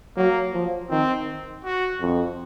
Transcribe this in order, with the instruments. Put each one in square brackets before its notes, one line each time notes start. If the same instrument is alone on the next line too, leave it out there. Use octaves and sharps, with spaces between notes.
[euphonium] F#3 [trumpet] A#3
[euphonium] F3
[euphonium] D#3 [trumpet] C4
[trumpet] F#4
[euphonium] F2